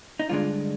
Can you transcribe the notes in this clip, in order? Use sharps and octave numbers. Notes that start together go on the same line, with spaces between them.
D#4
G2 D3 G#3 D4 F4